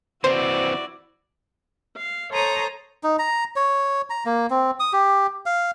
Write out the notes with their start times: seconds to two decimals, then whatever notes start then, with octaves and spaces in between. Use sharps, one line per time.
0.24 E3 C4 E4 F#4 C5 D5
1.95 F5
2.31 A4 C5 C#5 A#5 D#6
3.03 D#4
3.19 A#5
3.56 C#5
4.10 A#5
4.26 A#3
4.50 C4
4.80 D#6
4.93 G4
5.46 F5